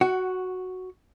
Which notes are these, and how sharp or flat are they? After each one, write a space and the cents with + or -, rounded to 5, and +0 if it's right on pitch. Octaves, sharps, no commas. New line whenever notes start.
F#4 +0 F#5 +20